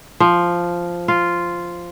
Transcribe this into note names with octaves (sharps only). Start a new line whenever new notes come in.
F3
F4